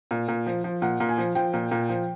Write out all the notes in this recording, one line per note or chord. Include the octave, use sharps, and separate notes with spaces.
A#2
A#2
F3
F3
A#2 F#5
A#2
G#5
F3
F3 G5
A#2
A#2
F3